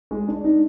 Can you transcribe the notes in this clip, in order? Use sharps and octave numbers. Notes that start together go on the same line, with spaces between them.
G#3
D4
D#4